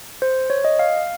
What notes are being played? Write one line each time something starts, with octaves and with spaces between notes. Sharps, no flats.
C5
C#5
D#5
F5